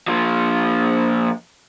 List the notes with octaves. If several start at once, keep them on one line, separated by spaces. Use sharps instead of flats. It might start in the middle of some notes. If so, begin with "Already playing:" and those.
A#2 F3